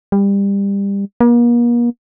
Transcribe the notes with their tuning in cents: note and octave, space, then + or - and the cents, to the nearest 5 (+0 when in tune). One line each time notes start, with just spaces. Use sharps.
G3 +25
A#3 +40